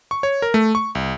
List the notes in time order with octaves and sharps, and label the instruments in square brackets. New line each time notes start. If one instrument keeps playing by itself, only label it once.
[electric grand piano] C#6
C#5
A#4
A3
C#6
C2